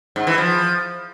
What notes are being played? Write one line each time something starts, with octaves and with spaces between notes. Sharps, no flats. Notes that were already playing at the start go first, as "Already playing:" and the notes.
G#2
E3
F3